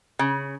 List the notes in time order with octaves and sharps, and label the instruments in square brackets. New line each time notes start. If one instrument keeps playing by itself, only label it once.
[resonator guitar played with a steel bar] C#3